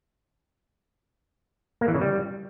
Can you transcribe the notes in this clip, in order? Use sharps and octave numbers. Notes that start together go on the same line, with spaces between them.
A#3
E3
C#3
G3